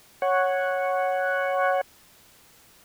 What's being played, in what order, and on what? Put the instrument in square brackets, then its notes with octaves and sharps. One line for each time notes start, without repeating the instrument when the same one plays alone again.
[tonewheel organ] C#5 F#5